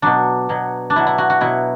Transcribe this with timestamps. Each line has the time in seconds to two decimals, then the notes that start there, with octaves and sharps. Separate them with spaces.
0.02 B2 F#3 D4
0.49 B2 F#3
0.90 D4
0.95 B2 F#3 E4
1.07 E4
1.18 F#4
1.30 F#4
1.41 B2 F#3 E4